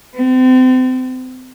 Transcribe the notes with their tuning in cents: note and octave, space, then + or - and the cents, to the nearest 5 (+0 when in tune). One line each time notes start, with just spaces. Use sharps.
C4 -35